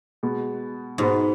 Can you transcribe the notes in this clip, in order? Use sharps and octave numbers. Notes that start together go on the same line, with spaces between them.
B2 G#3 B3
G#2 B2 G#3 B3